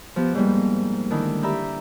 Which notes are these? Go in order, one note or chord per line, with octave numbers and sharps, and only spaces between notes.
F3 B3 G4
G#2 F3 G3 A#3
D3 D#3 G#3 D4 E4
G4 D5 E5 A#5 B5 G6